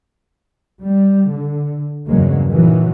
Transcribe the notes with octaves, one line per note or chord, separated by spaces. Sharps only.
G3
D3
E2 G2 C#3 F#3 G#3 A#3
A#2 D#3 E3 F#3